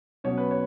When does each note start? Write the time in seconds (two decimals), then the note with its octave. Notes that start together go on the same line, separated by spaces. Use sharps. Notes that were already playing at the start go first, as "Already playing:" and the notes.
0.24 B2 F#3 C#4 C#5
0.38 B4
0.51 C#5